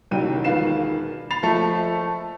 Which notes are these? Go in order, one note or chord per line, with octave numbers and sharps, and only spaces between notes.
F#1 C2 F#2 D#3 G5 D#7
E1 D#3 F4 B4 C7 E7
B5 A6 C7 F7
F#1 F3 A3 A4 E5